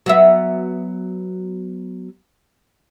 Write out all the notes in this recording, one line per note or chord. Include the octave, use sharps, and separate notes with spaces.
F#3 B3 E5